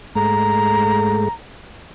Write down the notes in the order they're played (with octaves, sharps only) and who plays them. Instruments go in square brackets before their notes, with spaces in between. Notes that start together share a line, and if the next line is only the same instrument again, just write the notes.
[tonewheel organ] G#2 G#3 A3 [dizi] A#5